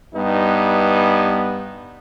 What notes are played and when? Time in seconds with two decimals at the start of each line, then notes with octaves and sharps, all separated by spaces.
0.14 G2 G3 B3 D#4